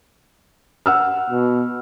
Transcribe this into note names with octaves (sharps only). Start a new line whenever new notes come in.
F#5 E6 F6
B2